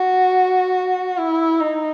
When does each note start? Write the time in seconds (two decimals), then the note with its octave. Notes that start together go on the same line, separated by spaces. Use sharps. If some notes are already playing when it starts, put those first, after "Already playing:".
Already playing: F#4
1.18 E4
1.61 D#4